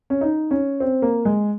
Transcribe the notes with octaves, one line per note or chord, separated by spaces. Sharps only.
C#4
D#4
C#4
C4
A#3
G#3